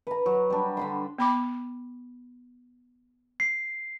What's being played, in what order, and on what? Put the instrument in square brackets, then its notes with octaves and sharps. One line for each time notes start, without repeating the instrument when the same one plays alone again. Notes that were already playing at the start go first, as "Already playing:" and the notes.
[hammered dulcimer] B4 A#5
F#3
G3 D4
D3 B5 C6
[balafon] B3 B5 D6
[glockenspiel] C7